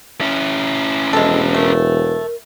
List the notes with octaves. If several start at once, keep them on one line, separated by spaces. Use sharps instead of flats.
C#4 E4
E1 G#3 A4
A3 A#4